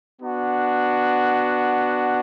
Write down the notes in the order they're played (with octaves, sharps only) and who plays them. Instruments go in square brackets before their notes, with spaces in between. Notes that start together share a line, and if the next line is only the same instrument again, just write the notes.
[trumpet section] B3 D4 F#4